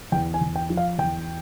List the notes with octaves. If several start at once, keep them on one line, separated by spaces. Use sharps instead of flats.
E2 G5
G#5
E2
G5
F3
F5
E2 G5